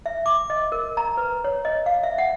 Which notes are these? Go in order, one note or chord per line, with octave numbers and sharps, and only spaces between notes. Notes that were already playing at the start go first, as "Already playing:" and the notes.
E5
D6
D#5
A#4
A#5
B4
C#5
D#5
F5
E5
F#5